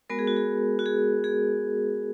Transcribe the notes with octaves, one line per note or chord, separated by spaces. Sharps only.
G#3 B3 F#4 A#4
G#4
F#4
G#4
F#4
G#4
G#4